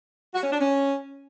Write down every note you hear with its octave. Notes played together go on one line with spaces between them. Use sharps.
F#4
C#4
D4
C#4